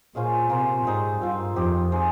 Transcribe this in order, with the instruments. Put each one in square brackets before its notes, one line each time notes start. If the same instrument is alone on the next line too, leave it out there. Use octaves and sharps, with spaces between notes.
[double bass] A#2 [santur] G#3 C#4 F4 C5
[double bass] C3 [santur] A#3 C#4 F4 C5
[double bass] G#2 [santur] G3 C4 D#4 G#4
[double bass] G2 [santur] F3 C4 F4
[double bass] F2 [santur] C4 D#4 G4
[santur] G#3 C4 D#4 G#4